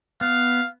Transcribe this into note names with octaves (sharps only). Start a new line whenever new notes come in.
B3 F5